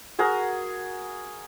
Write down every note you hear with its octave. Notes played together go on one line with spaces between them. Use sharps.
F#4 G#4 A#4 F#5